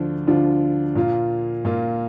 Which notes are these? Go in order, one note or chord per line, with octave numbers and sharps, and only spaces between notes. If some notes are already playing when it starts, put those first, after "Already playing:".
Already playing: D2 D3 F3 D4 F4
D2 D3 F3 D4 F4
A#2 A#3 F4
A#2 A#3 F4